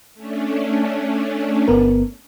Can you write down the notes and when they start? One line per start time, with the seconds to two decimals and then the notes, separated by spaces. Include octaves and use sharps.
0.15 A3 C#4 D4
1.68 G1 B3 A#4